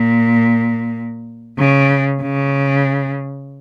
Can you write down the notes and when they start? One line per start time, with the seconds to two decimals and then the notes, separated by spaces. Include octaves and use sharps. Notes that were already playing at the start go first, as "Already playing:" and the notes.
Already playing: A#2
1.58 C#3
2.22 C#3